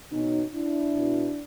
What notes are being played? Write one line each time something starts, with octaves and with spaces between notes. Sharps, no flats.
B2 C#4 D#4
D4 E4
B2